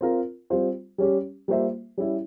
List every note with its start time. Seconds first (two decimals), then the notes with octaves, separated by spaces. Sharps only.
0.01 C4 F4 A#4
0.50 G3 C4 F4 C5
0.98 G3 C#4 G4
1.48 G3 A#3 F4 C5 E5
1.97 G3 C#4 E4